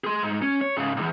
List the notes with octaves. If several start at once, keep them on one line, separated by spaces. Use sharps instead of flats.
G#4 C6
G#2
C#4
C#5
G#2 C#3
B1 E2